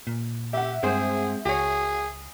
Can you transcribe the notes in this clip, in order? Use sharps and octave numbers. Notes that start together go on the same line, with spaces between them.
A#2
G4 E5 F#5
G2 G#3 C4 G#4 C5
C#2 F#4 G#4 C#5